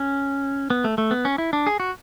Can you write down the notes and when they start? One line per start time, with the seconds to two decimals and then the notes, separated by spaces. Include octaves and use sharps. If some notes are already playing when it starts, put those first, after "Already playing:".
Already playing: C#4
0.70 B3
0.84 A3
0.98 A3
1.11 B3
1.25 C#4
1.38 E4
1.53 D4
1.67 G#4
1.80 F#4